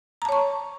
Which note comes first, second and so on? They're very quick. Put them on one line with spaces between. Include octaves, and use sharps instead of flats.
A#5 A5 C#5 C#6